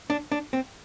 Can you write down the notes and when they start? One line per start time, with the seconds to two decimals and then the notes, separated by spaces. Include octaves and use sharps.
0.10 D4
0.32 D4
0.53 C4